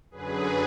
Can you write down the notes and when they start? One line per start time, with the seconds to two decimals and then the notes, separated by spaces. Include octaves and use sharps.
0.11 F#2 D3 F#3 G#4 B4